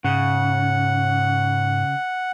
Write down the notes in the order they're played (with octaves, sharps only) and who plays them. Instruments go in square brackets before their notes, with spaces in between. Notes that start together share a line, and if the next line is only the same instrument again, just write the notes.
[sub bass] G#2 [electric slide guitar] C#3 [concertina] F#5